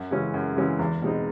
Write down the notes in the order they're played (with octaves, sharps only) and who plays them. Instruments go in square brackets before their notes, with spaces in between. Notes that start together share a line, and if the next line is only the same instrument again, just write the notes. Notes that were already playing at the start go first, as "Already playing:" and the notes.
Already playing: [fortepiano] F#2
C#3 E3 G#3 C#4
F#2
C#3 E3 G#3 C#4
E2
B2 G#3 C4 D#4